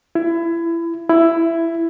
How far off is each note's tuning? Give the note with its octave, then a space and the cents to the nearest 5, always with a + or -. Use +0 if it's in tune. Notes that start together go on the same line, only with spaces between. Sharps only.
E4 +25
E4 +10